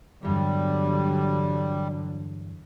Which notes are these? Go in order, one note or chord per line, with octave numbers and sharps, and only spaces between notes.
E2 G2 D3 F#3 G3